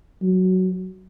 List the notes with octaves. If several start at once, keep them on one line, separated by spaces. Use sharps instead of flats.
F#3